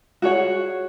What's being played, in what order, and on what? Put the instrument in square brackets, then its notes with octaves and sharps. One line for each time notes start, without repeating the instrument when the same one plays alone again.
[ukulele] F#4 G#4 C#5 F#5